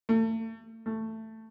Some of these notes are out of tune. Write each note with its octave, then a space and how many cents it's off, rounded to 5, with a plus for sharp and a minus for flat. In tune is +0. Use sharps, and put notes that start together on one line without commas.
A3 +35
A3 +10